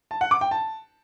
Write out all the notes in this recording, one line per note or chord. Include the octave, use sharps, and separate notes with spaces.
A5
F#5
D6
G5
A5